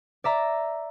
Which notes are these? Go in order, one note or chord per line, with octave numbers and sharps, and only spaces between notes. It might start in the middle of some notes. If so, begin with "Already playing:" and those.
D5 E5 A#5